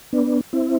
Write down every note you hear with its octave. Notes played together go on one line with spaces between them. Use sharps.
B3 D4
C4 E4